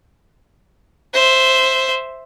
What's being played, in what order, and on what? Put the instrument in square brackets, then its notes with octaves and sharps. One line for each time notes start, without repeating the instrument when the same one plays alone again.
[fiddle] C5 E5